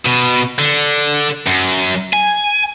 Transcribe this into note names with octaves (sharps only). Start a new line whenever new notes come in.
B2
D3
F#2
G#5